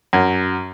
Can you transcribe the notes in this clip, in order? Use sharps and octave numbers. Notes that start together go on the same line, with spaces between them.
F#2